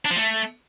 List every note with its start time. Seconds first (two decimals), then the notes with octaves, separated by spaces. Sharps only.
0.05 D4
0.11 F3
0.16 A3